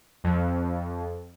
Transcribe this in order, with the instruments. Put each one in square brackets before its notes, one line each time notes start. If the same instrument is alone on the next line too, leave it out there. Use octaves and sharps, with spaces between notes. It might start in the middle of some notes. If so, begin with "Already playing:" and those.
[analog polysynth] F2